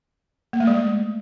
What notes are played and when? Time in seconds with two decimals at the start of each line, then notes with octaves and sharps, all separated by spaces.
0.53 A#3
0.60 A3
0.67 G#3